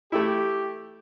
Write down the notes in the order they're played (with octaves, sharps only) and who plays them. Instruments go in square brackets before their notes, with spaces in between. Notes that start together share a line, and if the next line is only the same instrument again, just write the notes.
[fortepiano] A3 E4 [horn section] G4